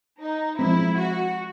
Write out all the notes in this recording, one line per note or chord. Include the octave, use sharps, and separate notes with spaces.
D#4
F3 G#3 C4 E4
F#4